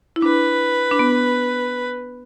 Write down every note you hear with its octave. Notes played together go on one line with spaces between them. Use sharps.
E4
D4 B4
D4
B3